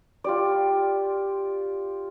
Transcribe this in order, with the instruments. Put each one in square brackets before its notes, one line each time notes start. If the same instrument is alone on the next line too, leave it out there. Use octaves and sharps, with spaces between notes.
[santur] F4 G4 D5